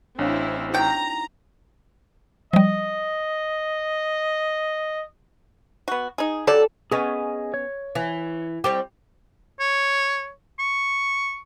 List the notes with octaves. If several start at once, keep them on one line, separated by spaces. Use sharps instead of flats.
A1 C4 D4 E4 C#5 F5
D#4 E4 F#4 G5 A#5
F3 G3 D#5
B3 F#4
D#4 G#4
F#3 G4 A4 D5
B3 C#4 G#4 D#5 G#5
C#5
E3
G3 C4 G4
C#5
C#6